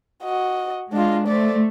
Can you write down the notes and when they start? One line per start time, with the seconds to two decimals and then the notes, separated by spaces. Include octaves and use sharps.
0.23 F#4 D#5
0.93 G#3 D4 F4
1.27 A3 C5 D5